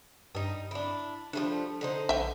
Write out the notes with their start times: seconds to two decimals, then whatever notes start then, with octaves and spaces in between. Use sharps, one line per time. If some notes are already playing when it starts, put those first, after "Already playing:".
0.35 G2 G3 D#4
0.71 D4 E4
1.33 F3 G3 A3 D4
1.81 D3 D#4 C5
2.09 A#1 E5 G5